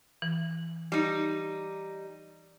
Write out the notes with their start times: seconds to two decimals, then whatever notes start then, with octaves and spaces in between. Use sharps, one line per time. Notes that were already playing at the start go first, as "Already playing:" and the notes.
0.22 E3
0.92 G3 D#4